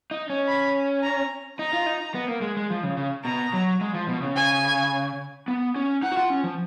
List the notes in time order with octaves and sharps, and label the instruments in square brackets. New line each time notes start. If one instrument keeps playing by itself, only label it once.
[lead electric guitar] D#4
C#4
[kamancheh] B5
A#5
[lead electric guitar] D#4 [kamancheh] A#5
[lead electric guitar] F4
D#4
B3
A#3
G#3
G#3
F3
C#3
C#3
[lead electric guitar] B2 [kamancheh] A#5
[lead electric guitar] F#3
G#3
F3
B2
C#3
[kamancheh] G#5
[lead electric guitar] B3
C#4
[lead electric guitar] D#4 [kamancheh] F#5
[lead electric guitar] F#4
F4
C#4
F3